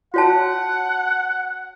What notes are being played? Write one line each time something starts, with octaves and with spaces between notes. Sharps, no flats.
F#4 C#5 F#5 A5